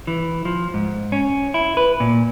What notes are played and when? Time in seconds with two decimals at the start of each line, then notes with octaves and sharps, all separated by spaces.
0.07 E3
0.45 F3
0.74 G#2
1.12 C#4
1.54 E4
1.77 B4
2.00 A#2